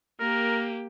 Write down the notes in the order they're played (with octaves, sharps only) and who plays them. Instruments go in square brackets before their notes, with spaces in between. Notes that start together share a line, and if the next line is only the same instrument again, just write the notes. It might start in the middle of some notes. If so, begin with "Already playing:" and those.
[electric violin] A#3 G4 [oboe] A#4